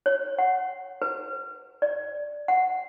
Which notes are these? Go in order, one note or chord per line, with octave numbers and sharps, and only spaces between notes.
C#5
F#5
B4
D5
F#5